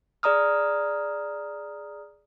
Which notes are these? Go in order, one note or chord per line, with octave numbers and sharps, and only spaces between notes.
G#4 D5 A#5 D#6 F6